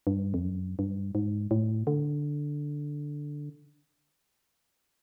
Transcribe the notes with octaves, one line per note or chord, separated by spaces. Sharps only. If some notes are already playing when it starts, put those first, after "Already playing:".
G2
F2
F#2
G2
G#2
A2
D3